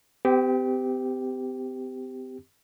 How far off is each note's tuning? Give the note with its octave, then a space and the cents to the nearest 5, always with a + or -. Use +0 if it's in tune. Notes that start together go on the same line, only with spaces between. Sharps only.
C4 -45 G4 +0